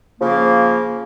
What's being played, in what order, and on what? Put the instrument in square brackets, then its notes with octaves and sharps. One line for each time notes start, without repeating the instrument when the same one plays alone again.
[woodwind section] C#3 F3 A#3